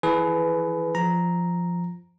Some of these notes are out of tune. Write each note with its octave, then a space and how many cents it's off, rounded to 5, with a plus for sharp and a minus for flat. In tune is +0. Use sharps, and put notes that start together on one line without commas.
E3 +5 G#4 +35 B4 +15
F3 +0 A#5 +0